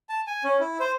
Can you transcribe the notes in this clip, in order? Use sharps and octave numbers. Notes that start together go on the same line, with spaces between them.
A5
G#5
C#4
E4
C5